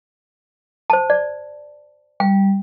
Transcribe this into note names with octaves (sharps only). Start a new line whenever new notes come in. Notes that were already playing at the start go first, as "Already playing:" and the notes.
C5 A5
D5
G3 G5